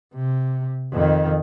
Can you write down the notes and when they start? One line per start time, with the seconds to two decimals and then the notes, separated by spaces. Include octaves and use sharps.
0.14 C3
0.92 F2 D#3